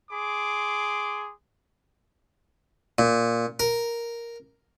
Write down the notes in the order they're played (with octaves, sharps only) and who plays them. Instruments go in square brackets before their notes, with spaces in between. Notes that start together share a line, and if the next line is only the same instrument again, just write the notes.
[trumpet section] G#4 C6 D6
[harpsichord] A#2
A#4